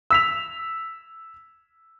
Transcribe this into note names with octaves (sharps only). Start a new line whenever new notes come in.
E6 B6 F7